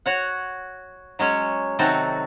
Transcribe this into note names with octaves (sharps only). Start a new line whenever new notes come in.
F#4 C#5 F#5
F#3 G#3 C#4 C#5
C3 D#3 F#3 C4 F#4 A4